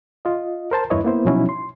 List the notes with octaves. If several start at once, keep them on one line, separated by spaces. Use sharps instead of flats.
F4 D#5
A#4 C5 A5
E2 G2 E4 B4 C#5 D#5
A#3 B3 E4 C5
B2 F3 F#3 C#4 D#4 E4
C6